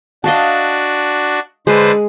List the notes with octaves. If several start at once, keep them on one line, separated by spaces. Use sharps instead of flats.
D4 F#4 D#5 F5 A5
D3 G#3 B4 C5